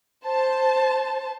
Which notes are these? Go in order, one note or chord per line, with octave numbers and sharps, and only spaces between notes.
C5 A5